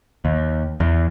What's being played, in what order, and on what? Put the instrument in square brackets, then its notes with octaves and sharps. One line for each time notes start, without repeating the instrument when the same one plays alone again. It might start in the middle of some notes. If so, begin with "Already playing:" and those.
[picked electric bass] D#2
E2